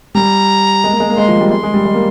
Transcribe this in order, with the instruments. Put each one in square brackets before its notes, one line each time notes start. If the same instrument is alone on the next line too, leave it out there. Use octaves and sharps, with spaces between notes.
[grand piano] G3 [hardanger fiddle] A#5
[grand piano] G#3
A#3
G#3
A#3
[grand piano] G#3 [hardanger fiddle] C6
[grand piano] F3
G3
[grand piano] G#3 [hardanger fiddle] C6
[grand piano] G#3
G3
G#3
A#3